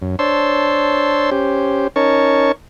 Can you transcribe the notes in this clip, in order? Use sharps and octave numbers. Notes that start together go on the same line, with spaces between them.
F#2
D4 C5 C#5 A5 C6 E6
C#4 G4 C5
C#4 D#4 A#4 C#5 A5 C#6